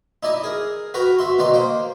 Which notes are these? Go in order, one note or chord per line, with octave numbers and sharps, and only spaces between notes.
D#4 E4 D5 D#5
G#4 A#4
F#4 A#4 B4 G5 A#5
F#4 E5 C6
B2 D#3 D#4 D5 C6
A#3 C5 G5